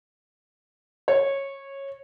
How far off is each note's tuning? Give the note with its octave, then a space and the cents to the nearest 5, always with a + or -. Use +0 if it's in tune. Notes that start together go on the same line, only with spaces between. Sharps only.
C#5 -15